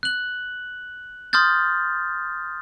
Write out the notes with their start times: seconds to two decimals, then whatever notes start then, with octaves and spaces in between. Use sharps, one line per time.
0.03 F#6 F#7
1.33 C6 D#6 F6 G6 A6